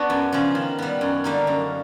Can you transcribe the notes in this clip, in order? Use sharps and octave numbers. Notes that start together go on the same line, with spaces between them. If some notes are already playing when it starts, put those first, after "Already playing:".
Already playing: B3 D4 F#4
F#2
C#3 F3
D#3
G3 B3
F#2
D3 G3 A#3 D#4
F#2